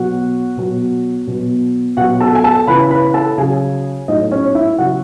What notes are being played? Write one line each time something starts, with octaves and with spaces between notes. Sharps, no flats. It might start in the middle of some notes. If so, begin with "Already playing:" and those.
Already playing: B2 F#3 F#4 F#5
B2 F#3
B2 F#3
B2 F#3 F#4 F#5
A4 A5
G#5
A4 A5
C#3 E3 B4 B5
B4 B5
A4 A5
C#3 F#3 G#4 G#5
A2 F#3 D#4 D#5
C#4 C#5
E4 E5
C#3 F#3 F#4 F#5